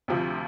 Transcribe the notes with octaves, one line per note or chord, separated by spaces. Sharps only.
D2 C3 F3